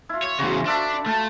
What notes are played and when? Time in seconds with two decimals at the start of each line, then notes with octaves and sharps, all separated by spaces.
0.09 E4 F4
0.23 C#5
0.39 E2 C#3 F#4 C5
0.66 D4 F4 A4 B5
1.06 A3 F5 A5